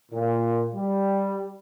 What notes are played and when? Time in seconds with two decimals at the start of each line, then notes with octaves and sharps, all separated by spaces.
0.12 A#2
0.75 G3